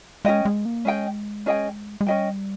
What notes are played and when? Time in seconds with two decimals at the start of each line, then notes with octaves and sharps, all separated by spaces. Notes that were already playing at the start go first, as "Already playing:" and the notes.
0.25 G#3 C#4 G#4 D#5 G5
0.45 G#3
0.65 A#3
0.85 G#3 C#4 G#4 D#5 G5
1.46 C#4 G#4 D#5 G5
2.01 G#3
2.07 G3 C#4 G#4 D#5 G5